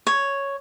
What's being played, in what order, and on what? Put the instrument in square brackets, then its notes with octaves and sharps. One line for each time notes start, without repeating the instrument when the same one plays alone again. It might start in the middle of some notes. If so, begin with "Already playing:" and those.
[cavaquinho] C#5